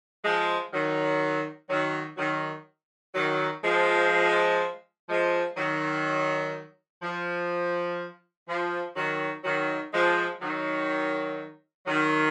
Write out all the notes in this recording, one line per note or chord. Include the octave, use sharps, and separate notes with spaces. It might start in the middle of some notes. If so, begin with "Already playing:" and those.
F3 G#3
D#3 F#3
D#3 F#3
D#3 F#3
D#3 F#3
F3 G#3
F3 G#3
D#3 F#3
F3
F3
D#3 F#3
D#3 F#3
F3 G#3
D#3 F#3
D#3 F#3